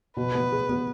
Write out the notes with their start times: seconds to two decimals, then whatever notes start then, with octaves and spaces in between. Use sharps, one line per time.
0.17 B2 B4
0.35 B3
0.52 G#4
0.69 B3